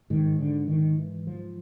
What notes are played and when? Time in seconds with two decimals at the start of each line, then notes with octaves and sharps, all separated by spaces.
0.10 G#2 D#3
0.39 D3
0.68 D#3
0.98 E3
1.27 F3